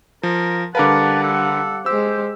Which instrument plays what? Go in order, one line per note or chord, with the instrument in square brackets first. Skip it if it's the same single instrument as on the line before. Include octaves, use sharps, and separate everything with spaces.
[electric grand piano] F3 [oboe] A#4
[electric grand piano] D3 A#4 B4 [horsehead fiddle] G3 F#5 [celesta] F5 D6 [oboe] A5
[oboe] A4
[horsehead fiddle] G#3 C5 [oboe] G4 [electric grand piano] E6